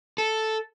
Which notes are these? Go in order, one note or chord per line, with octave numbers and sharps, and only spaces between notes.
A4